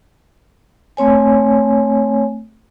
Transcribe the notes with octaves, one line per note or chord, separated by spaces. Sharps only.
A3 C4 C#5 G#5